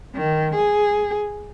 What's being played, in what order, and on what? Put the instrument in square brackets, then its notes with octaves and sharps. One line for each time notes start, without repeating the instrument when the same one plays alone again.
[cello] D#3
G#4